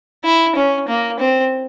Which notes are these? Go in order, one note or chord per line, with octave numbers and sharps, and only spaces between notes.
E4
C#4
A#3
C4